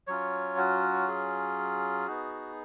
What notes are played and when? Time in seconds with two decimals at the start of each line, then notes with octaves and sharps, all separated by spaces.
0.07 F#3 C#4 F4 C#5
0.57 F#4
1.08 G#4
2.07 B3 D#4 F#4